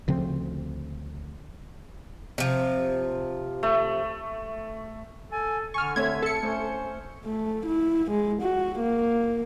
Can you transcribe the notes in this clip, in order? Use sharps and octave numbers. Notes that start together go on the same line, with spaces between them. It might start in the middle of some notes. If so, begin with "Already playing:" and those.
D2 C#3 F3 C4
C3 F3
A3
A4 G#5
D3 G#5 C#6 F6
A3 C4 C#5 E5 G#6
A4 C#7
A3 C#4 C5
A3
E4
G#3
F#4
A#3